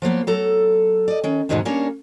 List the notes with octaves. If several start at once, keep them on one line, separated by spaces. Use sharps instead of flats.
F3 F#3 A#3 B3
F#3 A4 A#5
D5 D#5
D#3 C#4
E2 G#2 B2 D#3 G#3 D#4
G3 A#3 C#4 D4 A#4 C#5